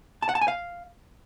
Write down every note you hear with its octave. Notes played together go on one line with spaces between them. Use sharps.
A5
F#5
A5
G#5
F5